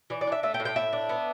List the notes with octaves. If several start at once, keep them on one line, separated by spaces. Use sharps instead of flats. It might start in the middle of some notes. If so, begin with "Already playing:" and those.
E3 D5
D5
D4 E5
A3 E5
G5
A2
G5
A2 E5
D4
B3